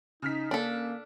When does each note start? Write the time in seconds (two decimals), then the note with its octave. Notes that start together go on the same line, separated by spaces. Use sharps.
0.22 C#3 D#4 F6 B6
0.51 A#3 D4 A4